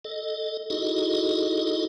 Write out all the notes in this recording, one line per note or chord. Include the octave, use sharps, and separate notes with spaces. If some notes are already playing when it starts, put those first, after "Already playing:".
A4 D#5
D#4 E4 F#4 G#4 A4 D#5